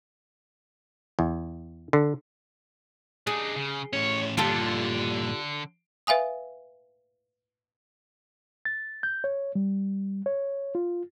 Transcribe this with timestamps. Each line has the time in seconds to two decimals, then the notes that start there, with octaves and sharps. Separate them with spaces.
1.19 E2
1.93 D3
3.27 D4 D#4 G#4
3.56 C#3
3.93 A2 C#4 C#5
4.37 G2 A#2 D3 F4 G4 A4
6.07 B4 E5 F5 G#5 D#6
8.65 A6
9.03 G6
9.24 C#5
9.55 G3
10.26 C#5
10.75 F4